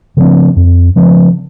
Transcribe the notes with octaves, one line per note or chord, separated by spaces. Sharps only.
C#3 F3 C4
F2
C#3 F3 C4